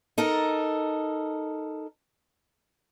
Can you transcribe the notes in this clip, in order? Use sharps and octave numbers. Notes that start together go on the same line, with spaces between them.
D#4 A4 A#4